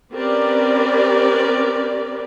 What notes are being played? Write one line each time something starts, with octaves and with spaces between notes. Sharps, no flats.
C4 C#4 G4 A#4 B4 D5